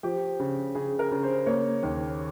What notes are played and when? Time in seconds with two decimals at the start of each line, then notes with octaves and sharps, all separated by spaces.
0.03 F3 G4
0.40 C#3
0.75 C#3 G#4
0.99 A#4
1.11 C#3
1.23 C5
1.46 A#3 C#5
1.83 D#2